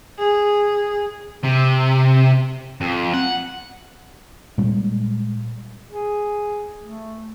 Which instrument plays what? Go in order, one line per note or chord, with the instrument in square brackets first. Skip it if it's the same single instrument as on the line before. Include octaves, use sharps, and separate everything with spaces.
[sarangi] G#4
[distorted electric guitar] C3
F2
F#5
[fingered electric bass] A#2 G3 G#3
[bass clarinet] G#4
A3